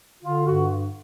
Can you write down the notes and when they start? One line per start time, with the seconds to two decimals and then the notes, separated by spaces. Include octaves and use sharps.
0.23 D3 F4
0.46 G2 F#4